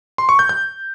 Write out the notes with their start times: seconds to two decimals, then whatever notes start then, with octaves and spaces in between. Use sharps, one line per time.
0.18 C6
0.29 C#6
0.39 G6
0.49 G6